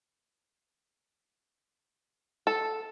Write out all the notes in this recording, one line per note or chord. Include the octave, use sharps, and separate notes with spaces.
A4